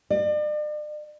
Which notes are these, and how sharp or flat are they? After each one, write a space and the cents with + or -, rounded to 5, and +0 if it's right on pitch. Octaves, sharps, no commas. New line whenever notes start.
D5 +40